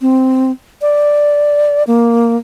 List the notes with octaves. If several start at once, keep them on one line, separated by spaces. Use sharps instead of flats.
C4
D5
A#3